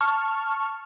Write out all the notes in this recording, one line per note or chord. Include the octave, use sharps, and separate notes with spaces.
A5 C#6 F6